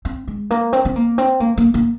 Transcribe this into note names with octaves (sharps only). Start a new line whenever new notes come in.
C4
G#3
A#3
C4
C4
A#3
C4
A#3
A#3
A#3